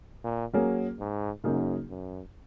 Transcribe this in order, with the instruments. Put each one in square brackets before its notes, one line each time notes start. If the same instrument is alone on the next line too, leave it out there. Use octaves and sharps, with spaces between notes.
[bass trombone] A#2
[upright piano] F#3 A#3 C#4 G#4
[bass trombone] G#2
[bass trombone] F#2 [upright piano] C#3 F#3 A#3 D#4 G#4
[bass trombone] F#2